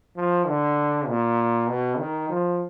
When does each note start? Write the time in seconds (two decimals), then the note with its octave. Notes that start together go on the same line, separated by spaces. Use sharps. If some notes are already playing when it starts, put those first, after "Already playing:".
0.17 F3
0.47 D3
1.07 A#2
1.68 B2
1.98 D#3
2.29 F3